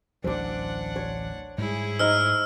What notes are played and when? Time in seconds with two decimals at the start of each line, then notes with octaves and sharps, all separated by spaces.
0.24 A1 D2 F#3 D4 C5 F#5 D6
0.96 C#5
1.58 G#2 G3 E4 G#4
1.99 D#4 C5 E6 F6